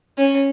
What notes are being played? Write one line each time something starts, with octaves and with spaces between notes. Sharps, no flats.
C#4